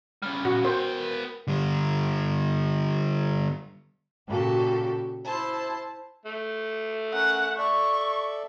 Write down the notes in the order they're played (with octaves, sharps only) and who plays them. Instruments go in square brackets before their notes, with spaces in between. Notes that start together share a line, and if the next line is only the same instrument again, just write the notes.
[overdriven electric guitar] C#3 G3 [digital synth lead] F6
[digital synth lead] A#2 [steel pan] F#4
[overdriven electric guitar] B3 G5 [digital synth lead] A#4 [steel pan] C5
[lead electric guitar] D3 G3
[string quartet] A#2 C#3 F#4 G4 A4
E4 C5 A5
[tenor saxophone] A3
[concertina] C#4 A#4 [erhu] F#5
[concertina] A4 D5 E5 [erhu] C#6